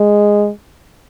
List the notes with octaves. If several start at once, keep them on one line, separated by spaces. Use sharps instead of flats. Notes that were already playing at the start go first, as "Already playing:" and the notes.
Already playing: G#3